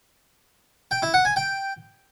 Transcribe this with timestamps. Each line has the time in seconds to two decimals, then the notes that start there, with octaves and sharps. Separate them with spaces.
0.91 G5
1.02 E4
1.14 F#5
1.25 G#5
1.36 G5